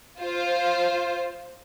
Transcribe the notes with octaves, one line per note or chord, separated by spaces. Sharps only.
F4 C5